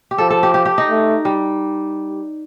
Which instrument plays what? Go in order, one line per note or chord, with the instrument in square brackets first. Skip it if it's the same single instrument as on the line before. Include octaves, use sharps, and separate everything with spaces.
[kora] G4
[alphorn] F3 [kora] A4
[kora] A4
G4
G4
G4
D#4
[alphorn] A3
[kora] G3